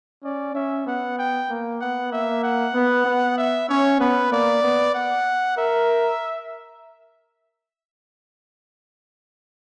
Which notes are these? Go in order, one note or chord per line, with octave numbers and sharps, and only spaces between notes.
C#4 D5
C#4 E5
B3 F#5
G5
A#3
B3 F#5
A#3 E5
F#5
B3
B3
E5
C#4 C#5
B3 B4
A#3 D5
B3
F#5
A#4 E5